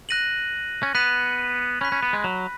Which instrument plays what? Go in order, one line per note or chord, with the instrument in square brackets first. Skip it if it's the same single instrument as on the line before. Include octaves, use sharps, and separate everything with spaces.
[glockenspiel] F#6 A#6 D#7 F#7
[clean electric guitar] C#4
[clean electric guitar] B3 [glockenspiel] F#6 B6 D#7 F#7
[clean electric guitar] C#4 [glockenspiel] B5 F#6 B6
[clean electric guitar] C#4
B3
G#3
F#3